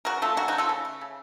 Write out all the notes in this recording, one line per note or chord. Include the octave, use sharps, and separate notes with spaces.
C#3 F#4 A#4
A3 F4 A4
C#3 F#4 A#4
D#4 F#4
A3
F4 A4
C#3
A3
C#3